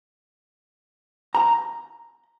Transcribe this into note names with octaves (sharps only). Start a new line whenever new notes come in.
A#5